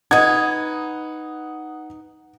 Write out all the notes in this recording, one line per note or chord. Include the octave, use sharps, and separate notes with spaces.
D#4 B4 F#5 D#6 G#6